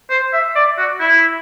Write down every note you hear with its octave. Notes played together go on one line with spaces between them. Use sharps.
C5
E5
D5
F#4
E4